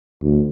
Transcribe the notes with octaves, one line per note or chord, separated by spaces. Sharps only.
D2